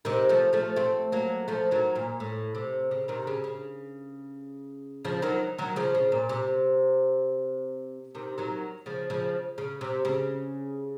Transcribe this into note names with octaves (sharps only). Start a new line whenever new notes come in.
C3 D#3
F3 A3
F3 A3
A3 C4
F#3 A#3
F3 A3
D#3 F#3
A#2
A2
C3
C#3
C3 D#3
C#3
C#3
C#3 F3
D#3 F#3
D#3 F#3
C#3 F3
C#3
A#2
C3
C3 D#3
D#3 F#3
C#3 F3
C#3 F3
C#3
C3
C#3